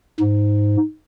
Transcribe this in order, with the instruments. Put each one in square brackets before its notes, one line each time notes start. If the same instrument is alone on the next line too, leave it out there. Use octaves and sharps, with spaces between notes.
[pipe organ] G#2